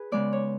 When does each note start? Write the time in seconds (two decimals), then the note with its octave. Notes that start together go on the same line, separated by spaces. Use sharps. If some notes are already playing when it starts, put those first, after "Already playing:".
Already playing: G#4 B4
0.12 C#3 G#3 B3 D5
0.33 C#5